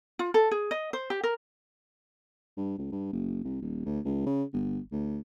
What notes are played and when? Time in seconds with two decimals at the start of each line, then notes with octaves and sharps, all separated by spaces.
0.19 F4
0.34 A4
0.51 G#4
0.71 D#5
0.93 C5
1.10 G4
1.23 A#4
2.57 G2
2.79 C#2
2.92 G2
3.13 F#1
3.44 C2
3.62 D#1
3.86 D2
4.05 C#2
4.26 C#3
4.53 G1
4.92 D2